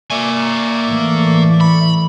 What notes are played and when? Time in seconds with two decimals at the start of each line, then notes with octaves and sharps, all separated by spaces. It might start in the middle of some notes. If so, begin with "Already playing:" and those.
0.10 A#3 D5 E5 G#5 C#6
0.85 A2 E3 A3
1.61 B5